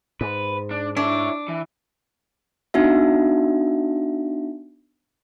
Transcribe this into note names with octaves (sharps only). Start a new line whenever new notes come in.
G#2 B4
D4
D4 E4 C#5
E3
B3 D4 D#4 F#4 E5